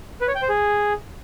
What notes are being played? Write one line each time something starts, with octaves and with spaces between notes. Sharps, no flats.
B4
C#5
G5
C5
G#4